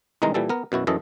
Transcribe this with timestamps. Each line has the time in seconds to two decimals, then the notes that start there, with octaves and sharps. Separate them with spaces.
0.22 C2 D#3 E3 G#3 D#4 A#5
0.34 A#2 E3 G3 A4
0.49 B3 A#4
0.72 F#2 B2 E4 F#4
0.87 F#2 E3 A4 D#5